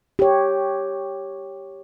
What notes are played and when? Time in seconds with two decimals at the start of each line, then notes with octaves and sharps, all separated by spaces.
0.19 G4 C#5